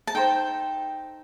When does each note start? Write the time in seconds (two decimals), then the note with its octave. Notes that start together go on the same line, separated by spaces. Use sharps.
0.07 A5
0.15 D#4 A4 C5 G5